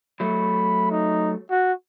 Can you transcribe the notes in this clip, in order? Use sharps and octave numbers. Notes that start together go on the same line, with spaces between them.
F#3 A3 B5
D#4
F#4